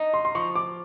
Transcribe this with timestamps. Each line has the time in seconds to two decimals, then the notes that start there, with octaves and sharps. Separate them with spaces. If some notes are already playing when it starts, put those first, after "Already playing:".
Already playing: D#4
0.14 C6
0.25 C6
0.35 F3 C#6
0.55 D6